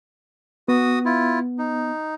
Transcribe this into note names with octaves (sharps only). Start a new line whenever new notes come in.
B3 F#4 D#6
E4 F4
D#4